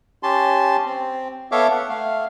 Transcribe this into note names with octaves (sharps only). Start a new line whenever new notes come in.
C#4 G4 A5 C6
C4
B3 A4 C#5 E5 F5 D6
F#5
A3 F5